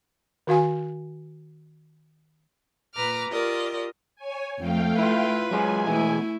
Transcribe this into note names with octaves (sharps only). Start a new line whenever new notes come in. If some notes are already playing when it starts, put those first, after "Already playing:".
D#3 F#4 F5 G#5
A#2 B4 A#5 D6 F6
F4 G4 A#4 D5 D#5
C#5 G#5
F2 A3 F5 G5
E4 F4 B4
F#3 G#3 F4 G#5
B2 E3 G#3 A3 E4